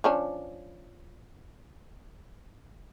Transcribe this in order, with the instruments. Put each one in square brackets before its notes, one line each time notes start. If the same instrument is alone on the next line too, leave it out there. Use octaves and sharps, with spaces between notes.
[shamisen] F3 C#4 D4